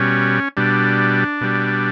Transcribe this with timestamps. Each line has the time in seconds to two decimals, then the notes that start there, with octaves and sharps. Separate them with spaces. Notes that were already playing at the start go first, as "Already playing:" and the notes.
Already playing: B2 G3 C#4
0.57 B2 G3 D4
1.41 B2 G3